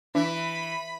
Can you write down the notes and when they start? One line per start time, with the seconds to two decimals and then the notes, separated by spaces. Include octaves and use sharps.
0.15 E3 D4 B5